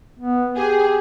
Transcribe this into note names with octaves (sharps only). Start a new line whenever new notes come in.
B3
G4 G#4